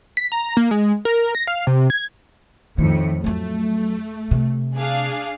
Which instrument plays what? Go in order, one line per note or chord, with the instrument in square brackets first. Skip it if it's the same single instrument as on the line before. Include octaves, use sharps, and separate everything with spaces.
[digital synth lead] B6
A#5
A#3
G#3
A#4
A#6
F5
C3
G#6
[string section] F2 A2 C#7 [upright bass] D#3
[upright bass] F2 F#3 [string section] A3
[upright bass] C3
[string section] D4 G#4 F5